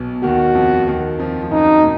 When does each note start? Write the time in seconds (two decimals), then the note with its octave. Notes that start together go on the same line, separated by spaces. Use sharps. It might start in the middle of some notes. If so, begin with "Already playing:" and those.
Already playing: B1 B2
0.23 D#2 D#3 F#4
0.55 F2 F3
0.87 D#2 D#3
1.19 F2 F3
1.42 F3
1.51 F#2 F#3 D#4
1.82 A#2